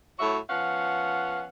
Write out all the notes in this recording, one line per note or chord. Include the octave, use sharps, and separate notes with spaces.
A2 F#3 F#4 C#5 E5
F3 B3 C#4 F5 F#5